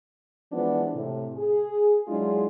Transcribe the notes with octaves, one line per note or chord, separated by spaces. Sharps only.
E3 F3 G#3 B3 D4
A2 C3
G#4
F#3 G#3 D4 E4 F4 G#4